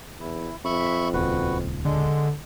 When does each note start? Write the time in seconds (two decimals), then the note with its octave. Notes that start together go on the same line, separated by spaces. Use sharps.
0.20 E2 E4
0.65 F2 E5 B5 C#6
1.14 D#1 C#2 F#4 B4
1.85 D3 G#3